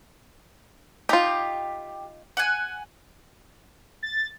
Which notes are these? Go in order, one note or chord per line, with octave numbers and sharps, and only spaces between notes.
D#4 F4 G4
F#5 G#5
A6